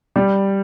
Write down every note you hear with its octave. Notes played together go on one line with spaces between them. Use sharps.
G3